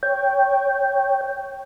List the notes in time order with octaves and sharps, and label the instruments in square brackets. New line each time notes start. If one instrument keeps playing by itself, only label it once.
[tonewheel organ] C#5 G5